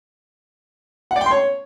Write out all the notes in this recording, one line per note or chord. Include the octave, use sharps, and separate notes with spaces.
F#5
D5
G5
C6
C#5